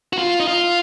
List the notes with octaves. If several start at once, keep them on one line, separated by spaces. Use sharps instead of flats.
F#4
F4
D#4
F4